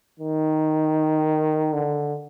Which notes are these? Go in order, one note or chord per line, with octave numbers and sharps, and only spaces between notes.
D#3
D3